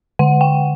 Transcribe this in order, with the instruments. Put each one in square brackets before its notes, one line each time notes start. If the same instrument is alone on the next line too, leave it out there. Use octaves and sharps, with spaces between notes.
[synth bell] D3 F#5
G5